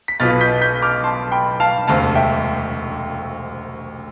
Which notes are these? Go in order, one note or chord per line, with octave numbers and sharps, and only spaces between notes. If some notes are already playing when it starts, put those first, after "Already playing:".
B6
B1 B2 B3 F4 F6 A6
G6 B6
G6 B6
D6 F6
A5 C6
G5 B5
F5 A5
E1 D2 C3 F5 A5
E5 G5